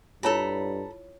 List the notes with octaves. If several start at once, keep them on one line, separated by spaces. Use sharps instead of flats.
G2 E4 F4 A4 C#5 A#5 B5